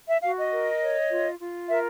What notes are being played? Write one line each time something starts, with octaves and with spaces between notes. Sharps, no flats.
E5
F#4 F5
D#5
A#4
C#5
F4
F4
A#4 E5